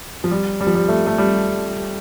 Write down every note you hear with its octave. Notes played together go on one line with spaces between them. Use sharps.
F3
G3
G3
F3
G3
A3
A3
G3